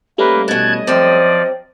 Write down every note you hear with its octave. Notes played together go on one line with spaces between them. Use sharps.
G3 A3 A#3 C#4 B4
B2 E3 D#5 A5 F#6 G#6
F#2 F3 C4 D5